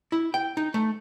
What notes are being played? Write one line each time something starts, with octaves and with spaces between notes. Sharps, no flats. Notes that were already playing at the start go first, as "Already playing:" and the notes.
E4
G5
D#4
A3